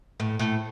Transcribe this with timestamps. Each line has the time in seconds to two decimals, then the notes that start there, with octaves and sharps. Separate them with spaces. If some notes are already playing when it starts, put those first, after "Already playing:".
0.20 A2
0.39 A2